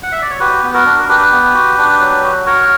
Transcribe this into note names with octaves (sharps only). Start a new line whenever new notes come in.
F#5
E5
D5
C#5
F#4 G4 B4
B3
F#4 A#4
D4
A#4
D4 G4 B4
B3
F#4
D4
F#3
F#4
F#4 A#4 C#5